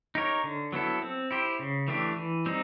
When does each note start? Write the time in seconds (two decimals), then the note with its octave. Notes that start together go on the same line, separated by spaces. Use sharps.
0.15 D#4 G4 A#4 C#5
0.44 D3
0.72 F#3 B3 E4 A4
1.02 C4
1.31 E4 G4 C5
1.59 C#3
1.88 E3 A3 D4 G4
2.16 E3
2.46 G3 C4 D#4